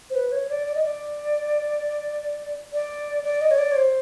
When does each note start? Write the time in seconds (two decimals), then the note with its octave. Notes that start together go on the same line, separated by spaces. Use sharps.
0.10 C5
0.15 B4
0.32 C#5
0.50 D5
0.67 D5
0.75 D#5
0.84 D5
2.73 D5
3.24 D5
3.41 D#5
3.51 C#5
3.58 D5
3.71 C#5
3.76 C5